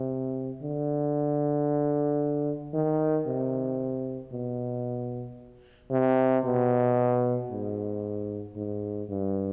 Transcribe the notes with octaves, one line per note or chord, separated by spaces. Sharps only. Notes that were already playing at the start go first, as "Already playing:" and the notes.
Already playing: C3
D3
D#3
C3
B2
C3
B2
G#2
G#2
G2